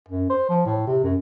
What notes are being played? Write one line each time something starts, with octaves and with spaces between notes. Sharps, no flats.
F#2
C5
F3
A2
C3
F#2